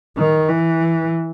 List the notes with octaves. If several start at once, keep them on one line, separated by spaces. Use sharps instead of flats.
D#3
E3